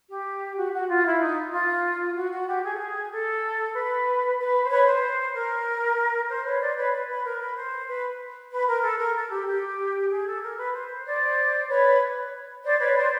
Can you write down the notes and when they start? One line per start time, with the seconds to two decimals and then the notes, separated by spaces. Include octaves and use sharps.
0.10 G4
0.57 F#4
0.73 F#4
0.89 F4
1.05 E4
1.21 D#4
1.53 F4
2.15 F#4
2.31 F#4
2.48 G4
2.64 G#4
2.74 A4
2.79 G#4
3.12 A4
3.74 B4
4.38 B4
4.64 C5
4.70 B4 C#5
4.86 C5
5.34 A#4
6.28 C5
6.45 B4 C#5
6.60 C5 D5
6.77 B4 C#5
6.92 B4
7.08 B4
7.24 A#4
7.40 B4
7.56 C5
7.88 B4
8.51 B4
8.67 A#4
8.83 A4
8.99 A#4
9.15 A4
9.30 G4
9.47 G4
10.10 G#4
10.26 A4
10.42 A#4
10.58 B4
10.73 C5
11.05 C5 D5
11.69 B4 C#5
12.64 C5 D5
12.80 B4 C#5
12.95 C5 D5